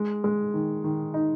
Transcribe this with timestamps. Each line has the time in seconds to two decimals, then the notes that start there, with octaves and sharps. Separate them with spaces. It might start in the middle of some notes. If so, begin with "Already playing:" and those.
Already playing: G#3
0.24 G#3
0.54 D#3
0.84 D#3
1.14 D#4